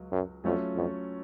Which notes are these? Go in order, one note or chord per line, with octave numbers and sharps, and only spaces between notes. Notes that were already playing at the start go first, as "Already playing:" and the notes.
Already playing: C#2 F#3
F#2
F2 F#3 A3 C#4 F4
F2